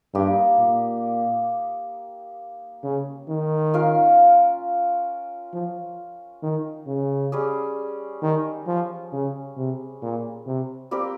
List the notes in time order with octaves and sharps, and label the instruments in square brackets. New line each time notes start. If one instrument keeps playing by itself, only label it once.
[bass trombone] G2 [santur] A#3 D#4 G4
[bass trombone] A#2
C#3
D#3
[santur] C#4 F4 A#4 F5
[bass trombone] F3
D#3
C#3
[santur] G3 C#4 G#4
[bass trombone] D#3
F3
C#3
C3
A#2
C3
[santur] G3 C4 G4 A#4